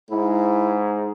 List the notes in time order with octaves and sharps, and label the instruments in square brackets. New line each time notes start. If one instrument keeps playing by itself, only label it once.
[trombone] G#2 [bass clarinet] E4